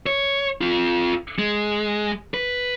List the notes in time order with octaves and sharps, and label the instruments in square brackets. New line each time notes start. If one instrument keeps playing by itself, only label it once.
[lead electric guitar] C#5
C4 F4
G#3
B4